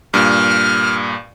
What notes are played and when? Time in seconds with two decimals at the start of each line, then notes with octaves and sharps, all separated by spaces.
0.14 G2 A#2 F6